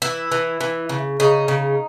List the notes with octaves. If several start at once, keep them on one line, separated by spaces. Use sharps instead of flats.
E3 E4
E3
E3
C#3
C#3 D#4
C#3